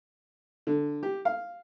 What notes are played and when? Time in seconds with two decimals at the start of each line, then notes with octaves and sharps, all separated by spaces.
0.67 D3
1.03 G4
1.25 F5